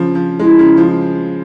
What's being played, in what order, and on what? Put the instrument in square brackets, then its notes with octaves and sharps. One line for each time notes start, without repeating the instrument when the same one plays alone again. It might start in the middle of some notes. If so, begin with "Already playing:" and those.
Already playing: [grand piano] C#3 F3
F3
[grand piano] G#3 [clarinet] E4
[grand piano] C#3
F3